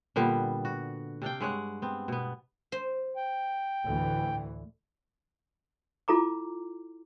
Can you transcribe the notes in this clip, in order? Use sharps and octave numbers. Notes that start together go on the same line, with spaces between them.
A#2 D3 G3 B3
F#4
C3 D4 F5 G5
G2 G#3 C#5 F#5
B3 C4
B2 B3
C5
G5
D2 A2 E3
E4 F4 A4 A#5 D6